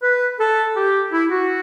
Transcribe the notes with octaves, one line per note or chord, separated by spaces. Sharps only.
B4
A4
G4
E4
F#4